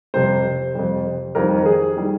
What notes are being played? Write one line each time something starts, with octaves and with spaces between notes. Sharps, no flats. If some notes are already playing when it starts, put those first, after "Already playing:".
F2 C3 G3 C5
F2 C3 G3
F2 D#3 G3 A#4
G#4
D#3 G3